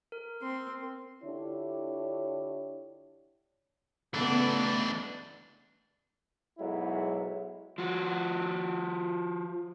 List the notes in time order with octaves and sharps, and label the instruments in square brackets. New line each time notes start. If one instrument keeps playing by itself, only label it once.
[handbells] A#4
[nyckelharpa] C4 C6
[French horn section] D3 D4 E4 F4 G4 C#5
[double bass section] C#3 A3 B3 [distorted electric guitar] E3 D4
[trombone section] B1 G#2 F#3 E4
[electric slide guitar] F3 F#4